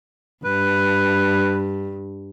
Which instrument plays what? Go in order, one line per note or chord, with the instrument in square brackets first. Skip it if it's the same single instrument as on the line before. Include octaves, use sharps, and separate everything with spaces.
[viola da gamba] G2 [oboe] B4